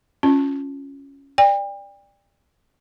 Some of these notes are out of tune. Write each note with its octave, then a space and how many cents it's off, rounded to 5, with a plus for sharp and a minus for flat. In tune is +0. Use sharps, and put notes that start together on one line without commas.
C#4 +0 F4 +0
D5 +0 G5 +35